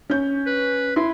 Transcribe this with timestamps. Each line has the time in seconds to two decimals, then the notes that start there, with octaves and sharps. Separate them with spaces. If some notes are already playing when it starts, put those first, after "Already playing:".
0.10 C#4 G6
0.47 B4
0.96 E4 C6